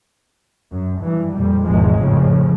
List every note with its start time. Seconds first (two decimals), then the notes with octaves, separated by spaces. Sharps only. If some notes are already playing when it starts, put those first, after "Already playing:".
0.72 F#2
1.01 G2 E3
1.33 F2 A#2 G3
1.65 G#1 E2 G#2 B2 F3 G#3
1.97 F2 A2 C#3 F3